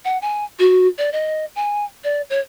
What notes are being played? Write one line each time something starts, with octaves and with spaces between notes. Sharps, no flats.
F#5
G#5
F#4
D5
D#5
G#5
D5
C#5